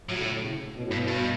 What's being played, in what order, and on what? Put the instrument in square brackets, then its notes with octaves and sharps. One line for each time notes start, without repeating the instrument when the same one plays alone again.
[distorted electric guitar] A2 [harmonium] F#3
[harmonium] D3
B2
A2
C#3
C#3
A2
B2
A2
[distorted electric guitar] G2 [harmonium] B2
[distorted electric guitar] G2